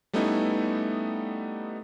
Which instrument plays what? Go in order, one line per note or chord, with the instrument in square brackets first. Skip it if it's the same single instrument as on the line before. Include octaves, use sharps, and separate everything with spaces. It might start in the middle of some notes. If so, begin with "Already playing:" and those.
[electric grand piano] G3 A3 B3 C#4 D#4 E4